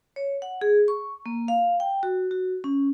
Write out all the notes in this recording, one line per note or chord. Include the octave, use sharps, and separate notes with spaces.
C#5
F#5
G#4
C#6
A#3
F5
G5
F#4
F#4
C#4